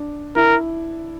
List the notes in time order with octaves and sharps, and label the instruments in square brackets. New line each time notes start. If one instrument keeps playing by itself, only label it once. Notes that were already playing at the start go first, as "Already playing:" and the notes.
Already playing: [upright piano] D4
[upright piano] E4 [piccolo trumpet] A#4